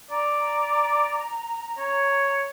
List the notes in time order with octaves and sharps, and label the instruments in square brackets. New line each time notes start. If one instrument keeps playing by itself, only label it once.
[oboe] D5 [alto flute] A#5
[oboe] C#5